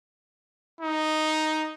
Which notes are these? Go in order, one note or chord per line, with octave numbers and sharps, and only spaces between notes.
D#4